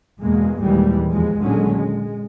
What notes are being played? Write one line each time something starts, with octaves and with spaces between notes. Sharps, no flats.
E2 G2 B2 G#3 A#3
D#2 A#2 E3 G3 G#3
E2 F3 G#3
A#2 D3 D#3 F#3 G#3 C#4
G#3